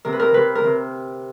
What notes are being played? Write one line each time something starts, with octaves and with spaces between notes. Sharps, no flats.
C3 A#4
B4
A#4
C3 B4
A#4
C3